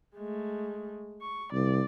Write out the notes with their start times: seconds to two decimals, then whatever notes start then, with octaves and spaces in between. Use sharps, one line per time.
0.15 G#3 A3
1.22 C#6
1.53 C2 D5